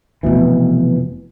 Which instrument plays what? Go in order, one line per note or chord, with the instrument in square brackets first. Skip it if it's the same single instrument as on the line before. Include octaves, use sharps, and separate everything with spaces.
[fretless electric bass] F1 C2 B2 E3